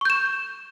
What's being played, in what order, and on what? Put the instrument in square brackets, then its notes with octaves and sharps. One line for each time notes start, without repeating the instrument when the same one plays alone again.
[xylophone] C#6
G6
E7